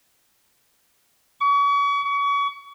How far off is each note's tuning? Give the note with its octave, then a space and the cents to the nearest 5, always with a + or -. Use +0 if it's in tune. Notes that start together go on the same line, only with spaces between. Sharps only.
C#6 +40
C#6 +35